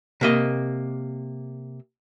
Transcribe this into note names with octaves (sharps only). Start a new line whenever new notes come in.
C3 A#3 D#5